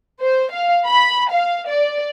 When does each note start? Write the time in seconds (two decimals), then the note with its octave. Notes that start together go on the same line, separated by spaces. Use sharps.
0.22 C5
0.52 F5
0.86 B5
1.31 F5
1.68 D5